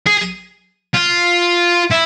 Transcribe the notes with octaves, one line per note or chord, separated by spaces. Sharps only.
G#4
F4
E4